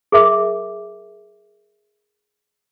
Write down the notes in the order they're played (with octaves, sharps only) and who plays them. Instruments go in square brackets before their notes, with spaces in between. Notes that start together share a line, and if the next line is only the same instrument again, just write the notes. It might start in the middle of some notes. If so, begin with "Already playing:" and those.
[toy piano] G#4 A#4 E5 D6